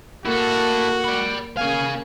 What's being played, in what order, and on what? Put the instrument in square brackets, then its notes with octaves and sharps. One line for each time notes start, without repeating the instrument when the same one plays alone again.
[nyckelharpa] A#3 [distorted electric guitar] E4 A4 [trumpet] F#4
[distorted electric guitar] D5 B5
[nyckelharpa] A#3 C#4 [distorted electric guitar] G#4 F5 [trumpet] G#5